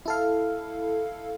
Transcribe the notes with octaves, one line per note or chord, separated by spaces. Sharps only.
E4 A4 F5